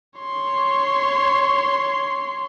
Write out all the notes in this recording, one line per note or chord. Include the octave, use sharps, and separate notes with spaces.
C#5 C6